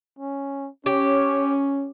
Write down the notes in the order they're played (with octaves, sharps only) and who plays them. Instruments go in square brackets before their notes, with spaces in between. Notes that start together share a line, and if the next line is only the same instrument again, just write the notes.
[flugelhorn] C#4
[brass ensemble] C#4 [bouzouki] G4 [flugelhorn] C#5